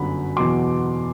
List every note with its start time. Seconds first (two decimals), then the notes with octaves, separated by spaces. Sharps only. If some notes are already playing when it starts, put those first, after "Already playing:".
Already playing: G1 F#2 D3 F#3 B5
0.37 E2 B2 F#3 C6 D6